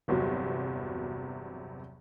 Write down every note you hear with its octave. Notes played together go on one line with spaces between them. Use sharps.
G1 E2 C3 F#3